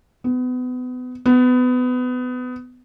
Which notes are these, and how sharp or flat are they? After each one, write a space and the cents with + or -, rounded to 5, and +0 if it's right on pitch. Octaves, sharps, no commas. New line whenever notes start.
B3 +30
B3 +25